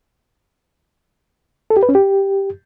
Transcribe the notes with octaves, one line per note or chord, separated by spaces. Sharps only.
A4
G4
B4
C#4
G4